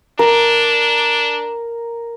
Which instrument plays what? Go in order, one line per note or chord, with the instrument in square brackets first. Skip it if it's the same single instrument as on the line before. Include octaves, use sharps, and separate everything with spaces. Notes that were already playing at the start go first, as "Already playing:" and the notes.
[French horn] D4 [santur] A#4